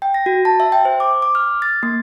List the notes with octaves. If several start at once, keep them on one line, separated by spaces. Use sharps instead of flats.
G5
A#6
F#4
A5
E5
G5
C5
D6
D6
F6
A6
A#3